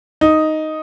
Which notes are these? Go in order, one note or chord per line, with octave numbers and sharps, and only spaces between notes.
D#4